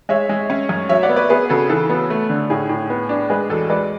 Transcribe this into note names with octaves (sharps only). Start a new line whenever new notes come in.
G#3 C#5 E5
G#3
C#4
F#2
F#3 C#5 E5
D5 F#5
B3
B4 D5
B3 G#4 B4
C#3 F#4 A4
E3 F#4 A4
B3
A3
D3
A2 G#4
A2
B3
D4
G#3 G#4 B4
E2 F#4 A4
G#3 B4 D5